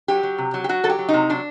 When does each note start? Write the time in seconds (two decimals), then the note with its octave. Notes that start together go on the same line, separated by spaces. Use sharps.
0.08 F#3 G4
0.23 F#3
0.38 C3
0.54 F#3
0.64 G4
0.69 F#3 F#4
0.83 F#3 A4
0.89 G4
0.99 F#3
1.09 C3 D#4
1.30 F#3 D4